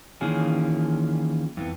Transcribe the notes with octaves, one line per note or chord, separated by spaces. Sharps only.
D#3 E3 A#3 C#4 F4 G#4
F2 E3 B3